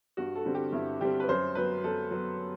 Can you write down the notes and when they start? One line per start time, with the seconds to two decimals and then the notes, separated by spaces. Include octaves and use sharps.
0.17 G2 F#4
0.36 A4
0.45 D3 G3 C4
0.55 G4
0.72 G2 E4
1.00 D3 G3 C4 G4
1.20 B4
1.29 F#2 C5
1.55 F#3 B3 B4
1.84 F#2 A4
2.11 F#3 B3